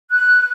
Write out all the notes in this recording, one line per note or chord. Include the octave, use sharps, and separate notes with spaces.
F#6